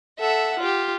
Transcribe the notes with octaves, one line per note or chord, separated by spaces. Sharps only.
A4 E5 F#5
F4 G4